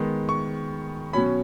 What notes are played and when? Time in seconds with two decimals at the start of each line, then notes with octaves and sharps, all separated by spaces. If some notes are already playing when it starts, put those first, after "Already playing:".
Already playing: D#3 G#3 B3
0.29 C#6
1.13 B2 F#3 C#4 B5